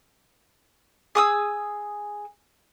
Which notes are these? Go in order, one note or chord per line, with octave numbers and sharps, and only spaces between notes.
G#4 D#6 E6